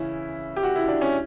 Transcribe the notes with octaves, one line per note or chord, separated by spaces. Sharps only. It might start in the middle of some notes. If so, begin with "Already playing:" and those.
Already playing: C#3 E3 C#4 E4
G4
F#4
E4
D4
C#4